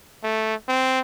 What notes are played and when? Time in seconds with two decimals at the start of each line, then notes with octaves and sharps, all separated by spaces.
0.24 A3
0.68 C4